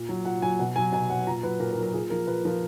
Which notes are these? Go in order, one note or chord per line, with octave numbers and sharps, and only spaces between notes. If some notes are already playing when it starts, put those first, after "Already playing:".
Already playing: A#2
F#3
A#2 F#5
F#3 G#5
B2 F#5
F#3 G#5
B2 G#5
F#3 F#5
A#2 A#5
F#3 B4
A#2 A#4
A#4
F#3
A#4
A#2 G#4
F3 A#4
A#2 B4
F3 A#4